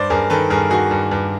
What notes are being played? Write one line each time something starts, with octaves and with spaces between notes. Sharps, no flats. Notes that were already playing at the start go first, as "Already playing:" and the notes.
Already playing: G2 C5 D5
G2 G#4 A#4
D#3 A4 B4
G2 G#4 A#4
D#3 F#4 G#4
G2
G2